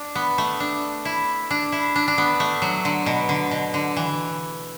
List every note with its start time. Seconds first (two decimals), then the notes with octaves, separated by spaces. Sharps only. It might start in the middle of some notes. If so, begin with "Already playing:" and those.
Already playing: D4
0.15 B3
0.38 A3
0.60 D4
1.05 E4
1.51 D4
1.72 E4
1.96 D4
2.08 D4
2.18 B3
2.40 A3
2.62 F#3
2.85 D3
3.06 B2
3.29 D3
3.51 B2
3.74 D3
3.96 E3